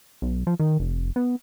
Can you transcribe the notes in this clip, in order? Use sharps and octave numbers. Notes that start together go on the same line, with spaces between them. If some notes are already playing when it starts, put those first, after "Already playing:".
B1
F3
D#3
F1
B3